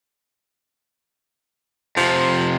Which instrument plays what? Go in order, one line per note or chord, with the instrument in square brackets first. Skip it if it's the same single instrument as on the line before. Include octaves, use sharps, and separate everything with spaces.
[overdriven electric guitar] F2 C3 [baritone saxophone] F3